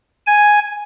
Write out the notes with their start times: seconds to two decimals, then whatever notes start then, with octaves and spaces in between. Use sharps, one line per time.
0.27 G#5